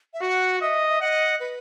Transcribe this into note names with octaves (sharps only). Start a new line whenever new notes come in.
E5
F#4 F#5
D#5 E5
E5
D#5 F#5
B4